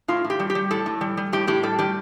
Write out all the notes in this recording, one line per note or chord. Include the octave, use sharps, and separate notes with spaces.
A2 F4
A2
G4
G3
G4
G3
A2 A4
A2
G3
G3
A2 G4
A2 G4
G3 A4
G3 G4